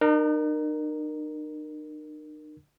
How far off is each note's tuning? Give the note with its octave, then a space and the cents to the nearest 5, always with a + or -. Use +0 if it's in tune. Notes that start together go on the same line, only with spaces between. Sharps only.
D#4 -45 A#4 +0